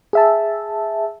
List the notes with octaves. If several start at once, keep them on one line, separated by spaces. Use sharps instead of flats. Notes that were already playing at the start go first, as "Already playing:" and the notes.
G#4 E5 A5